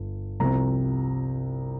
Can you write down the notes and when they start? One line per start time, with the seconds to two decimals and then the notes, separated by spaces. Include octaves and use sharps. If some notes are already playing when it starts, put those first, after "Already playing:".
Already playing: G1
0.40 C2 C3 F3 C4 A#5